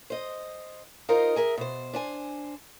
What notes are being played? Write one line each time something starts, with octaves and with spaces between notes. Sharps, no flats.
C5 D#5
D#4 F4 A#4 C5 D#5
G#4 A#4 E5
B2 C5
D4 C5 G#5